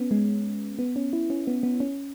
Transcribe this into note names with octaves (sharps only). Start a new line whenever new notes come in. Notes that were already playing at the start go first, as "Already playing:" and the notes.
Already playing: B3 C#4
G#3
B3
C#4
E4
C#4
B3
B3
C#4